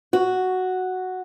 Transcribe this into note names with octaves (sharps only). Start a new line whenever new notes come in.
F#4